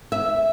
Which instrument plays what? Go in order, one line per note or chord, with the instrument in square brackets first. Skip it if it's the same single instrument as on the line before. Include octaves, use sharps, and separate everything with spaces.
[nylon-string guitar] E5